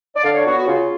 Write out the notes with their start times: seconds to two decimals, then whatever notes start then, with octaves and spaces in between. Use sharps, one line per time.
0.16 D5
0.24 D3 F5
0.34 C#5
0.45 F#3 B3 F#4
0.56 F#4
0.66 C#3 F4